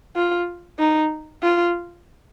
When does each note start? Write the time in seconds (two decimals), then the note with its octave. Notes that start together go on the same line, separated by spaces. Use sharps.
0.16 F4
0.79 D#4
1.43 F4